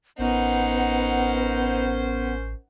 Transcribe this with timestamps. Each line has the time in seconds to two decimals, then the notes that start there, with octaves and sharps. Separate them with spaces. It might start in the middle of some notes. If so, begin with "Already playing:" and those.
0.19 A1 B3 C#4 D#4 A#4 C5 F#5